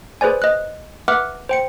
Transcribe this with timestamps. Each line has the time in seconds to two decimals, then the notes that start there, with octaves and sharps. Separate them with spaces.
0.21 G#4 B4 C5 D5 G#5
0.42 D#5 F#6
1.08 B4 E5 F#5 D6 F6 F#6
1.49 C5 G5 C#7